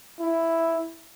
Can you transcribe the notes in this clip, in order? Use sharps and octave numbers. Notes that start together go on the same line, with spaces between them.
E4